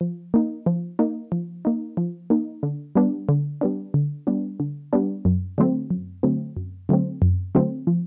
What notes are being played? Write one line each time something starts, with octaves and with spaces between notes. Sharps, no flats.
F3
A#3 D#4
F3
A#3 D#4
F3
A#3 D#4
F3
A#3 D#4
D3
G3 B3 D4
D3
G3 B3 D4
D3
G3 B3 D4
D3
G3 B3 D4
F#2
D3 F#3 A3 C4
F#2
D3 F#3 A3 C4
F#2
D3 F#3 A3 C4
F#2
D3 F#3 A3 C4
F3